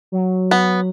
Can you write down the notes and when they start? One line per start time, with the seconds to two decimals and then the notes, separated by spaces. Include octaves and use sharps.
0.12 F#3
0.51 B3